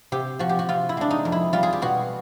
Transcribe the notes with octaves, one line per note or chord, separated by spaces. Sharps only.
C3 G4
F3 F#4
G4
F#4
C3 F4
E4
G#3 D4
D#4
F2
E4
G3 F4
G#4
G4
B2 F#4